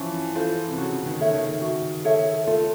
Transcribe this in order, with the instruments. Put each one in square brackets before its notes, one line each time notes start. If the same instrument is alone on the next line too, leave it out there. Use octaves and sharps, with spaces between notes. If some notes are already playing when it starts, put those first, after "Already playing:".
Already playing: [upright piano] E3 F3 [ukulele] C#4
[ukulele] F4 A4 C5
[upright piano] C3
[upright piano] C#3 [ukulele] F#4
[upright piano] D#3
[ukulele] A4 C#5 E5
[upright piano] D#3
[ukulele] F#4
A4 C#5 E5
[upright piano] A3 [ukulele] F4